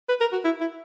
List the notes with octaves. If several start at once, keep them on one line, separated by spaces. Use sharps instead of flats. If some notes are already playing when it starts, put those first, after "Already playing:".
B4
A#4
F#4
E4
E4